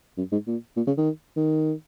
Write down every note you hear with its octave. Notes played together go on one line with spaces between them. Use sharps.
F#2
G#2
A#2
A#2
C#3
D#3
D#3